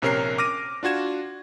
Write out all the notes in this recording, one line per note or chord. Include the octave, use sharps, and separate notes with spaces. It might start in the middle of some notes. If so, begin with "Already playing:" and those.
A#1 C3 C#4 A#4 C#5 C7
D6 F6 A#6 D#7
D4 F4 F#4 G#6 E7